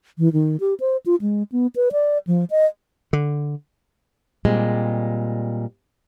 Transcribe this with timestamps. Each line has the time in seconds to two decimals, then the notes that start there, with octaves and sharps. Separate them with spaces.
0.18 E3
0.33 D#3
0.60 G4
0.80 C5
1.06 F4
1.21 G#3
1.52 B3
1.76 B4
1.92 D5
2.27 F3
2.50 D#5
3.13 D3
4.45 A#2 G3 G#3 C4